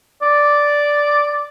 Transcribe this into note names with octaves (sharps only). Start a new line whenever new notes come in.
D5